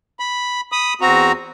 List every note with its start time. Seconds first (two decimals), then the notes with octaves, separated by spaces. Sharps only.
0.20 B5
0.72 B5 D#6
1.01 E2 C4 F#4 A#5